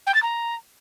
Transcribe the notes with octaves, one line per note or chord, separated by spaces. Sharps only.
G5
A6
A#5